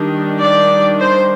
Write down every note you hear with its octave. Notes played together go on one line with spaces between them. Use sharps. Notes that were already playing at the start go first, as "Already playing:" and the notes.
Already playing: D#3 G3 D4
D5
C5